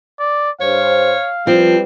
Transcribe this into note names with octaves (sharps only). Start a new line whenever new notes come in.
D5
G2 C5 C#5 F5
F3 G3 C4 B4